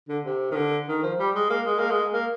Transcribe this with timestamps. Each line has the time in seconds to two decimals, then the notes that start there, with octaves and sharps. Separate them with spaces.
0.08 D3
0.25 C3
0.51 D#3
0.55 D3
0.88 D#3
1.03 F3
1.19 G3
1.35 G#3
1.50 A#3
1.66 G#3
1.79 A#3
1.90 G#3
2.14 A#3